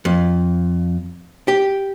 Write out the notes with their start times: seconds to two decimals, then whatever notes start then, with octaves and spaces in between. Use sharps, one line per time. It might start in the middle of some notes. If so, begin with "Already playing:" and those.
0.05 F2
1.48 G4